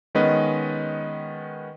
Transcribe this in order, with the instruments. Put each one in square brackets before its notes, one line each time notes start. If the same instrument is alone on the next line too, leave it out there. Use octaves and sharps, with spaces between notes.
[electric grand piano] D#3 G#3 B3 C#4 B4 D#5